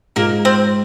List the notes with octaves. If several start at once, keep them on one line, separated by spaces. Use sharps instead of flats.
G#2 G#3 A#3 F4 G#4 A#4
C4 C5